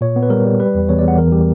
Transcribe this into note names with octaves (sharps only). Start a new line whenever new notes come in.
A#2 C#5
B3
B4
G3 A#4
G3
G3 B4
E2
E2 C#5
D5
E2
F#5
E3 A#4
G3 G4